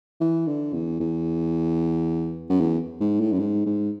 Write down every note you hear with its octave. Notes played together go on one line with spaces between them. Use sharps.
E3
D3
E2
E2
F#2
E2
G#2
A2
F#2
G#2
G#2